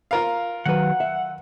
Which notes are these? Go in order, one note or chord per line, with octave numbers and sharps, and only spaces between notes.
F4 A#4 F5
D#3 F#3 B4 F#5
E5